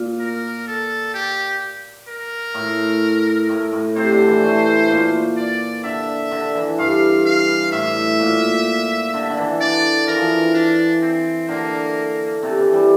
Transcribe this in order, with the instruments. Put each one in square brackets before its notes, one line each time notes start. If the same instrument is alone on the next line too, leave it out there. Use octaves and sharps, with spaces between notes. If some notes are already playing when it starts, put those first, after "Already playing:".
Already playing: [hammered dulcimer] A#2
[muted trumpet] A#4
A4
G4
A#4
[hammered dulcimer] A2
A2
A2
[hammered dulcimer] C3 [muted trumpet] C5
[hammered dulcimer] D3
E3
A3
A#2
[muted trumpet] D5
[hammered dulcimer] D3 [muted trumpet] E5
[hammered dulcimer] D3
E3
[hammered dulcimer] G2 [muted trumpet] F5
[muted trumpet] F5
[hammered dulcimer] A2 [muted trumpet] E5
[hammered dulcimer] A#2
D3
D3
E3
[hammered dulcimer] D3 [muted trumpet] D5
[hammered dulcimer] E3 [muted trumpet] A#4
[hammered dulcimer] F3
E3
[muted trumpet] D4
C4
[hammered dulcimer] D3 [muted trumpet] A#3
[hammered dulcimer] C3 [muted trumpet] A3
[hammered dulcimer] E3
G3